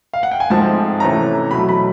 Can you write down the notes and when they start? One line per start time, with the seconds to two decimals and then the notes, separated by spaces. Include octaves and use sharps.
0.14 F5
0.23 F#5
0.31 G5
0.40 G#5
0.50 G#2 F3 A3 C4 A5
1.00 C3 E3 A3 C#4 A#5
1.51 B2 F#3 A3 B5
1.69 B5